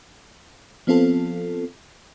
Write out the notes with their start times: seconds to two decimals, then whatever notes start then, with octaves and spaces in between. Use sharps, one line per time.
0.87 F3 B3 C4 F4 A4